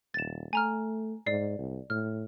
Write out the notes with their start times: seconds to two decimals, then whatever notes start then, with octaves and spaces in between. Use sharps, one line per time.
0.14 D#1 A6 E7
0.53 A3 G#5 A#5 F6
1.26 G#2 D5 C7
1.58 C2
1.90 A2 F6